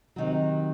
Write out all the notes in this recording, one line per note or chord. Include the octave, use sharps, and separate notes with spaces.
C3 D#3 F#3